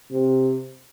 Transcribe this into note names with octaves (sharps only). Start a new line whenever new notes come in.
C3